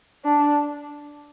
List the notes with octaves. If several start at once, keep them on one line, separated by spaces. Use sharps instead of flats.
D4